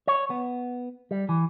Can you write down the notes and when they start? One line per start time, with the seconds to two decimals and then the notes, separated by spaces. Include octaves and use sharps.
0.07 C#5
0.30 B3
1.11 G3
1.29 E3